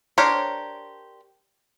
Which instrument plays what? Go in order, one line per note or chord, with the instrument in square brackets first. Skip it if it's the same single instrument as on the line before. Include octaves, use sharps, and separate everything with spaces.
[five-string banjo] D4 G4 A#4 C5 C#5